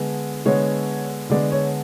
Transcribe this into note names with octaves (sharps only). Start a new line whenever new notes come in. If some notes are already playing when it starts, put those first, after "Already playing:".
Already playing: D3 G#3 B3
D3 G#3 B3 C#5
D3 G#3 B3 D5
C#5